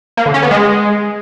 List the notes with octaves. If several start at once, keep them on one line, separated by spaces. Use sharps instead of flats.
A#3
D3
C#4
B3
G#3